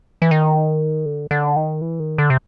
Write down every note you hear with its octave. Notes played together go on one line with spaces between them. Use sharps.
E3
D#3
D3
D3
D#3
E3
D#3
D3
C3